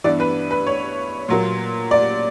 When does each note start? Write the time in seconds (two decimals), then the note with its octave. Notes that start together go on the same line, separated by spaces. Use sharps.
0.04 G2 E3 B3 D5
0.20 B4
0.51 B4
0.67 C#5
1.28 A#2 F#3 A#3
1.91 D5